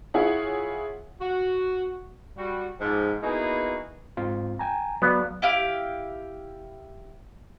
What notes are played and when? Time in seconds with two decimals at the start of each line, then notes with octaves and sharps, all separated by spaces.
0.14 E4 F4 G#4 C#5 F#5
1.20 F#4
2.37 G3 F#4
2.80 G#2 F3
3.23 A#3 B3 D#4 E4 F#4 G#4
4.17 G#2 C4 F4
4.59 G5 G#5 A#5
5.02 F#3 B3 D5 F5
5.42 E4 G4 F5